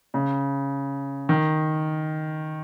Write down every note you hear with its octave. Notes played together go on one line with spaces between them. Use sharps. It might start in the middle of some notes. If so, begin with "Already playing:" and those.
C#3
D#3